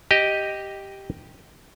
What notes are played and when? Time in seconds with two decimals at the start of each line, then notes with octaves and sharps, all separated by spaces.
0.11 G4 D#5